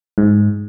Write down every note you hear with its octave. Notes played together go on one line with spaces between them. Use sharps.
G#2